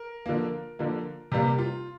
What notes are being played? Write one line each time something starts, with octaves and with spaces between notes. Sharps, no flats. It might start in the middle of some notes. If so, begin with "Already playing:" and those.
Already playing: A#4
D3 F3 A#3
D3 F3 A#3
C3 G3 A#3 G4
F4